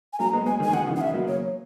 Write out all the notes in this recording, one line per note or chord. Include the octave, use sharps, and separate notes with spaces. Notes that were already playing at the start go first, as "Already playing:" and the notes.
G#5
F#3 A#3 A#5
G#3 B3
G#3 B3 G#5
D#3 G#5
D#3 F#5
C#3 E3
F#5
E5
F#3 A#3
C#5